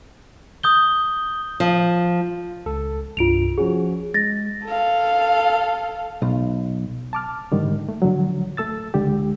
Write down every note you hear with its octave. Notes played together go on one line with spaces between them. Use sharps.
D#6 G6 G7
F3
C#2 A4
C2 G2 F4 D7 F7
F3 C#4 F#4 G#4
G#3 A6 A#6
A4 F5
B1
A5 D6 F6
G#2 D3 D#3 G3
A3
A2 D3 F3 F#3
A3 A4 E6 A6
C#2 D3 G#3 G4